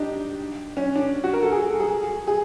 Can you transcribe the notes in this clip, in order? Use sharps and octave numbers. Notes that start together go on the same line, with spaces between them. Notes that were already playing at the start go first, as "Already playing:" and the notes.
Already playing: D4 D#4 G4
C#4
D4
F#4
A#4
A4
G#4
A4
G#4
G#4